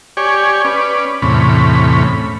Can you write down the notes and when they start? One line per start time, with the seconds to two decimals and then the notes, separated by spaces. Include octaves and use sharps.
0.17 G4 C#5 D5 G#5
0.65 C#4 B4 D5
1.22 E2 A2 C3 C#4 B5